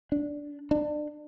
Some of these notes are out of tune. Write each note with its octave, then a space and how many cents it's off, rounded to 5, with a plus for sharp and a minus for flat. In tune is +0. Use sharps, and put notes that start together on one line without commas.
D4 -10
D4 +25